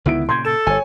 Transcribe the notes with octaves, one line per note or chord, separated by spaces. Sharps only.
C#2 D3 D#3 B3 E4 D7
A#2 C#3 C6 G6 G#6
A4 E7
G1 C#5 G#5